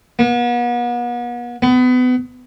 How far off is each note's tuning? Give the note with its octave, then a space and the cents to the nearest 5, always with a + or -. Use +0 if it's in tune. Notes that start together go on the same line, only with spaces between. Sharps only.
B3 -40
B3 +30